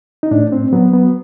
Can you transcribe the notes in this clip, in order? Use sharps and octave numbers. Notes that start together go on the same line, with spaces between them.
D#4
A2 D4
C4
F#3 B3
B3